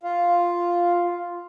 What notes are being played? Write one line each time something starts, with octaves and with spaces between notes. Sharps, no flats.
F4